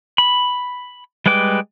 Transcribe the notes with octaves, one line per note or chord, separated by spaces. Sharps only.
B5
G3 G#3 B4 G5 D6